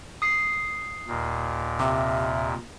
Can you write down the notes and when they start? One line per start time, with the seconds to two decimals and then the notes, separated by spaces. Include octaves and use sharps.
0.22 D#6 C7
1.08 D#2 A#2
1.80 C3 E5